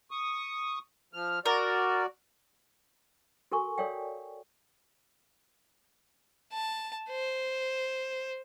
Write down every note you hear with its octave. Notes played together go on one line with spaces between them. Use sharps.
C#6 D#6
F3 F6
F#4 A#4 D5
F#4 A4 A#4 G#5 C#6
A4 A#4 C#5 D5 F5 G5
A5
C5